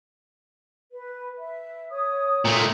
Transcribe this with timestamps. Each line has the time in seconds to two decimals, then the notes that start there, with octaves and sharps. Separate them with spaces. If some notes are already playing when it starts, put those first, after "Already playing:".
0.92 B4
1.38 E5
1.91 C#5 D#6
2.45 A#2 A3